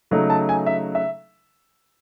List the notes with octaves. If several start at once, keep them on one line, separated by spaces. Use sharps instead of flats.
C#3 F#3 A3 D#4
A5
G#5
E5
E5